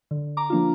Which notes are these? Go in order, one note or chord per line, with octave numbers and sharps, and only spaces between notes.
D3
A#5 D6
F3 A#3 D4 F4